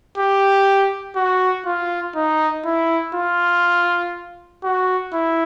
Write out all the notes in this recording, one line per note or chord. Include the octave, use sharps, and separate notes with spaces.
G4
F#4
F4
D#4
E4
F4
F#4
E4